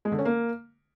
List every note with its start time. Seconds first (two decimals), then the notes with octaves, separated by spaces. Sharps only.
0.05 G#3
0.12 D3
0.19 C#4
0.25 A#3